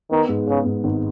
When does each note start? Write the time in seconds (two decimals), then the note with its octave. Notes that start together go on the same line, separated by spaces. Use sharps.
0.11 D#3 B3
0.28 G#2
0.47 C#3 B3
0.65 G#2
0.84 G#1